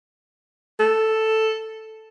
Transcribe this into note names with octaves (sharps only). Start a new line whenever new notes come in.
A4